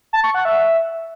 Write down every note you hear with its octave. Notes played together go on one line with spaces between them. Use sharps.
A5
C#6
F#5
E5